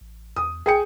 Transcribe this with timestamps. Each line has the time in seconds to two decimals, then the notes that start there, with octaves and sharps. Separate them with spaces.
0.01 A1
0.36 E2 D#6
0.66 B1 G#4 G5 C#7